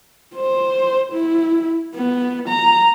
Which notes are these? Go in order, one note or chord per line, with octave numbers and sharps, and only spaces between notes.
C5
E4
B3
A#5